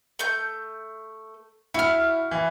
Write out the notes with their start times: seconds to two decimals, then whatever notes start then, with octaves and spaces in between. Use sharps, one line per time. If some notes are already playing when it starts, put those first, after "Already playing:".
0.19 A3 G6
1.74 E4 F#4 F6
2.31 E3